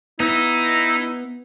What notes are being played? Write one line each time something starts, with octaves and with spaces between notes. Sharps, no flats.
B3 D#4 E4